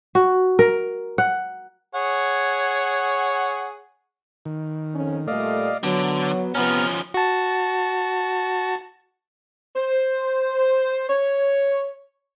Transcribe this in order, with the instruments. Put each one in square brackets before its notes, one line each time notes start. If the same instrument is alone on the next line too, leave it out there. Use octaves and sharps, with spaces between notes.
[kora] F#4
A#4
F#5
[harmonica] G#4 C#5 F#5
[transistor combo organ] D#3
[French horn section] F2 C#4
[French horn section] A#2 G3 A3 [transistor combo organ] D5 D#5 F5
[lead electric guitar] D3 [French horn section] F#3 [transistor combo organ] B3
[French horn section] C3 B3 [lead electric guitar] F3 C#4 [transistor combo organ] A#5 F6
[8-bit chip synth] F#4 A5
[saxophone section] C5
C#5